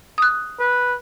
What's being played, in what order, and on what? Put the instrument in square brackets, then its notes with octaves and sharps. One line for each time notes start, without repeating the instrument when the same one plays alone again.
[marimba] D#6 F#6
[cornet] B4